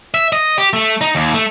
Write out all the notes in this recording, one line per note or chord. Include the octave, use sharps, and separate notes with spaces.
E5
D#5
G4
A3
D#4
D#2
A3